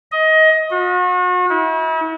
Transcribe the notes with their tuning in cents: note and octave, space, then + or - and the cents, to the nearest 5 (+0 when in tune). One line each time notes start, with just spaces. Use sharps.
D#5 +20
F#4 -40
E4 -40